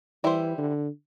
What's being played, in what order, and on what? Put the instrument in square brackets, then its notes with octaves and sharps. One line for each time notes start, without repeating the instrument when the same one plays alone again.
[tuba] E3 [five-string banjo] G3 E4 C5
[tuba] D3